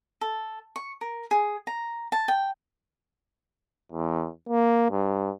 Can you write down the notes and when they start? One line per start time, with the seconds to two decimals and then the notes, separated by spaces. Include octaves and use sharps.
0.21 A4
0.76 C#6
1.01 A#4
1.31 G#4
1.67 A#5
2.12 A5
2.28 G5
3.92 E2
4.49 A#3
4.90 G2